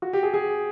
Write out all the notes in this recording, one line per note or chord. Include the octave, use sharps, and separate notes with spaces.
F#4
G4
G#4
G#4